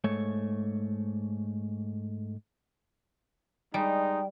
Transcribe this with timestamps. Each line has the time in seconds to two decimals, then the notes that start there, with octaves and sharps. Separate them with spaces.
0.04 G#2 A3 C#5
3.74 G3 G#3 D#4 G5